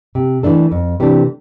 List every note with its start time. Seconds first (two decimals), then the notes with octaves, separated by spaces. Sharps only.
0.15 C3
0.43 E3 A3 D4 A4
0.71 F2
1.00 C3 E3 A3 D4